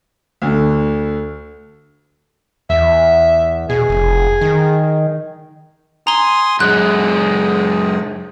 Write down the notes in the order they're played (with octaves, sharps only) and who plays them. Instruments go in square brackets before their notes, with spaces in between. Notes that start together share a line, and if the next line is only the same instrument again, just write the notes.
[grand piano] D2 D3
[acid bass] E2 [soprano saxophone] E5
[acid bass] B2 [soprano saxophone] G#4
[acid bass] F1
D#3
[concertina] G#5 C6 D#6 [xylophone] A#5 G7
[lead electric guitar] F#2 G#3 [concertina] G#4 [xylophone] F#6